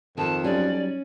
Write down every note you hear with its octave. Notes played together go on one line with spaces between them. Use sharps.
F2 D#3 A5
F#3 G3 C#4 D#4 D5